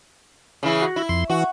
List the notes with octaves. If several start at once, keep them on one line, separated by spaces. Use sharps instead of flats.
C#3 E3 E4
F#4
E4
F2 C6
E3 F#4